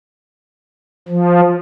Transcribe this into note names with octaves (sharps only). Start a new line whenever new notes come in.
F3